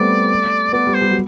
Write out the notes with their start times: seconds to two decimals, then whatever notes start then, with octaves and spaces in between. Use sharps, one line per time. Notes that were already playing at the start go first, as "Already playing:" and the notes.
Already playing: G3 A3 B3 C4 D5
0.73 B3 D5
0.87 G3
0.94 C5
1.01 G3
1.11 F#3